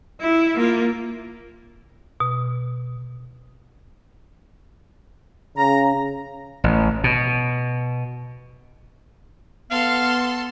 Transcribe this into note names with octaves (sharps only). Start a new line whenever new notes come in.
E4
A#3 F4
B2
C#3 A#5
A1
B2
B3 A4 F5 C6